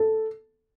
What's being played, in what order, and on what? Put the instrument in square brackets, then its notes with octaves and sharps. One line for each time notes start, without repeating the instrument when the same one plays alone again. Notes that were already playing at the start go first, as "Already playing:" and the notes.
Already playing: [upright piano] A4